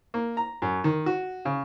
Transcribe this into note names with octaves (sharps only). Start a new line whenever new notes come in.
A#3
A#5
F#2
D#3
F#4
C#3